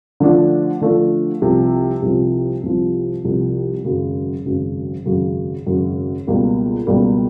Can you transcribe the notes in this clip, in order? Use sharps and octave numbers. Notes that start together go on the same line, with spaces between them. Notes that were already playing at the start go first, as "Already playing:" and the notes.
D3 F3 A3 D4 F4
D3 F3 A3 D4 F4
C2 C3 F3
C2 C3 F3
C2 C3 F3
C2 C3 F3
G#1 F#2 C#3 F#3
G#1 F#2 C#3 F#3
G#1 F#2 C#3 F#3
G#1 F#2 C#3 F#3
C#2 B2 G3 A#3
C#2 B2 G3 A#3